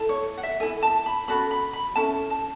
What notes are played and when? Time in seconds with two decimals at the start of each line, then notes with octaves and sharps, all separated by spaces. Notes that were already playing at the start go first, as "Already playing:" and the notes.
Already playing: E4 A4
0.09 C#5
0.37 F#5
0.43 E5
0.60 E4 A4 G#5
0.83 A5
1.06 B5
1.28 C#4 F#4 A4 B5
1.51 B5
1.73 B5
1.96 C#4 E4 A4 A5
2.30 A5